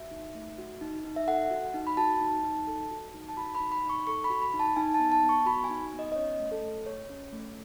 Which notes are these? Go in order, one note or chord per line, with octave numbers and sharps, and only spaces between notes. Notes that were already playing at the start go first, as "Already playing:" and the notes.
Already playing: F#4 E5
D#4
A3
F#4
D#4
D#4
E5
A4 F#5
F#4
D#4
B5
F#4 A5
D#4
D#4
A4
F#4
D#4
A5
F#4 B5
B5
D#4
B5
D#4
C#6
A4 C#6
B5
F#4
B5
D#4
A5
D#4 G#5
A5
B3
A5
B3
C#6
F#4 B5
G#5
D#4
B3
D#5
D#5
C#4 C#5
A3
A4
A3
G#4 C#5
C#4
A3